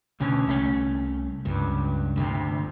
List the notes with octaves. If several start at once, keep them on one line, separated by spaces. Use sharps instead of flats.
D2 B2 C#4
C2 A3 C#4
C#2 G2
G1 D2 C3